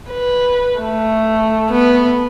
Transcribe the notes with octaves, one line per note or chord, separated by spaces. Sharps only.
B4
A3
B3